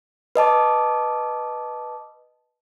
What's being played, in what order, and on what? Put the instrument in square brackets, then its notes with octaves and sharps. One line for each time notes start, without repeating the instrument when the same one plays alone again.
[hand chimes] B4 D#5 A5 D6